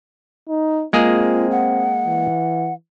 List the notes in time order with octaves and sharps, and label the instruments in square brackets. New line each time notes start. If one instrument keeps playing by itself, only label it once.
[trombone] D#4
[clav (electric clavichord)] G#3 A#3 G#4 [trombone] C4 [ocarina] F4
[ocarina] F#5
[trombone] E3